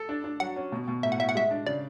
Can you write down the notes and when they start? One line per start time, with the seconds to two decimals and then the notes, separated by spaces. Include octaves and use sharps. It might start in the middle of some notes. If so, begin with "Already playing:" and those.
Already playing: A4
0.09 D4
0.24 D4
0.40 F#3 F#5
0.56 C#4
0.72 B2
0.88 B2
1.03 A2 E5
1.12 F#5
1.18 A2 E5
1.29 F#5
1.35 G#3 E5
1.51 D4
1.66 C#3 D5